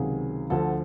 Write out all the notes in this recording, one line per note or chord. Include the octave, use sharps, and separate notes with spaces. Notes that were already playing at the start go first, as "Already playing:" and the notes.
Already playing: C#2 C3 D#3 F#3 G#4
D2 D3 F3 A4